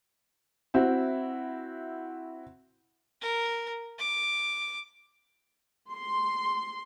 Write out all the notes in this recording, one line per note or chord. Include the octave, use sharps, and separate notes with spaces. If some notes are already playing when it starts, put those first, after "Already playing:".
C4 E4 F#4
A#4
D6
C6